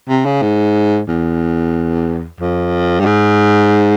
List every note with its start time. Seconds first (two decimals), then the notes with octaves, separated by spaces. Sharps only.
0.09 C3
0.26 C#3
0.42 G#2
1.08 E2
2.40 F2
3.00 G2
3.06 G#2